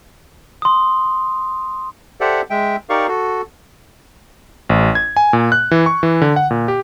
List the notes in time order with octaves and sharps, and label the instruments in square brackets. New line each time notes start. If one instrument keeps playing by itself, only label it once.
[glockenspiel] C6 D#6
[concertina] G4 A4 C5 D5 E5 F#5
G#3 E5 G5
D#4 G4 A#4 D5 F5 C#6
F#4 A4
[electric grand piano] A1
G#6
G#5
A#2
F#6
E3
C#6
E3
D3
F#5
A#2
G4